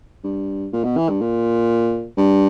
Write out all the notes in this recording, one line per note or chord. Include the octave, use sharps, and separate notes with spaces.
G2
A#2
B2
E3
G2
A#2
G2